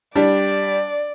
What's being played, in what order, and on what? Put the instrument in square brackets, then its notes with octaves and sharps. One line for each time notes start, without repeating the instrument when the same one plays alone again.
[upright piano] G3 [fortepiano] D4 [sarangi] D5